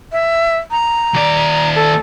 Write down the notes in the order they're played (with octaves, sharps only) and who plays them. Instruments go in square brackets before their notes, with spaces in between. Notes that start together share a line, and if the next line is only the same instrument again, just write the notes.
[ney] E5
A#5
[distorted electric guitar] D#2 D5
[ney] A4